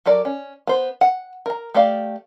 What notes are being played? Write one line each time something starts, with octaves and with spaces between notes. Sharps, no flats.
F#3 A4 A#4 D5
C#4
B3 C5
F#5
A#4 A#5
A3 G4 D5 F5